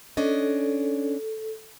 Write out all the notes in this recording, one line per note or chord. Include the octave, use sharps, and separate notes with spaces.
C#4 D4 A4 D#5